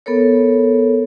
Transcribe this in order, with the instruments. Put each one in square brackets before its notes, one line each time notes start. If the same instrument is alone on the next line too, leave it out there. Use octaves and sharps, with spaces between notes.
[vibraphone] B3 A4 A#4 C#5